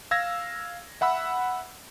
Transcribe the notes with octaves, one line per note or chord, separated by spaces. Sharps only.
F5 E6 G#6 A#6
E5 F#5 B5 E6